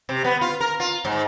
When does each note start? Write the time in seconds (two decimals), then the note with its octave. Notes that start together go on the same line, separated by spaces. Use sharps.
0.09 C3
0.24 B3
0.41 F4
0.60 A#4
0.80 F4
1.05 G#2